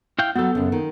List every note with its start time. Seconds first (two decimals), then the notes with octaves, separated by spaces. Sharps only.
0.19 E4 F5 G5
0.36 F#3 B3 F#4 A4
0.55 F#2 C#3
0.72 D#3